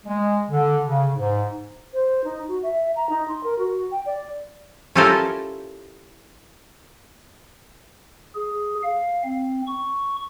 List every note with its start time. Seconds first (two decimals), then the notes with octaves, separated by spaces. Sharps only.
0.06 G#3
0.50 D3
0.87 C#3
1.15 G#2
1.93 C5
2.24 D#4
2.48 F#4
2.63 E5
2.96 A#5
3.10 D#4
3.28 C6
3.44 A#4
3.59 F#4
3.92 G5
4.06 D5
4.95 C#4 E4 F4 G4 A4 A#4
8.35 G#4
8.83 F5
9.24 C4
9.67 C#6